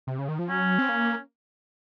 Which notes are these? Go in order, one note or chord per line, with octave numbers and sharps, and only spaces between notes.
C3
C#3
D#3
F3
F#3 C#4
C4
A#3